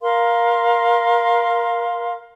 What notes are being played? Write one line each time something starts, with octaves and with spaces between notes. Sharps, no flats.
A#4 F5 C6